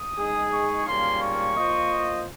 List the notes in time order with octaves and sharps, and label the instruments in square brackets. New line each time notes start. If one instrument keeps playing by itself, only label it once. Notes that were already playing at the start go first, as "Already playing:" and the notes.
Already playing: [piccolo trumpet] D#6
[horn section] G#3 D#4 G#4
[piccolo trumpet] C#6
[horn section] G#2 G3 A#3 C#4 F4 [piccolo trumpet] C6
[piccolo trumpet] C#6
[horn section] A#3 F4 C5 D#5